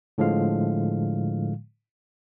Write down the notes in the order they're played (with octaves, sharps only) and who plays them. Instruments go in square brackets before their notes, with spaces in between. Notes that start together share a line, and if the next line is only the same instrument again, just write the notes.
[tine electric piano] A2 D3 F3 G#3 F5